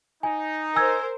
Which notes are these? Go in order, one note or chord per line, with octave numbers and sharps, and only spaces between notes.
D#4 G#5
A#4 C5 G#5 E6 G#6